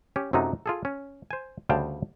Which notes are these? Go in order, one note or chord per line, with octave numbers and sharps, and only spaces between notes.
C#4 G4
F#2 C3 F#3 A3 D#4 F4
F4 G#4 A4
C#4
C5 G#5
D2 C#3 G3 F5 G5 A5